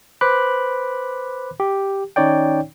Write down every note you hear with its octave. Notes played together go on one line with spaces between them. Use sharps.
B4 C5 B5 D6 F#6
G4
D#3 C#4 D#4 C#5 D5 G5